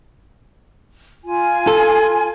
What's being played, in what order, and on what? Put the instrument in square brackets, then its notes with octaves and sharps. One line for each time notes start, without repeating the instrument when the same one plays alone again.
[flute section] F4 G#5
[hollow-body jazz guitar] A4